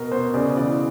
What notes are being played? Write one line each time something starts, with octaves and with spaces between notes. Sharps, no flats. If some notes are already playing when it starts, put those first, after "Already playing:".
Already playing: B2 A#4
B2 C5
C#3 D5
E3 D5